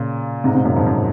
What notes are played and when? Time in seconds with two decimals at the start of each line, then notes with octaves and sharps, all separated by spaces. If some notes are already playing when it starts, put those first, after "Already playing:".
Already playing: A#2 C#3
0.44 G#2 C3
0.54 G#2 C3
0.65 F#2 A#2
0.76 F2 G#2
0.86 F#2